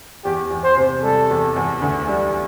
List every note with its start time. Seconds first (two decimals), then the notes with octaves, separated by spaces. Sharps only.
0.24 E2 G4
0.51 E2
0.64 C5
0.77 C3
1.03 G3 A4
1.30 E2
1.56 E2
1.82 D2
2.09 G3